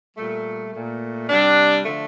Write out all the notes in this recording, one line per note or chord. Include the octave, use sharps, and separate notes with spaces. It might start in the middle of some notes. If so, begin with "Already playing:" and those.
A#2 G3 A3
A#2 A3
C3 G3 D4
D3 F3 A3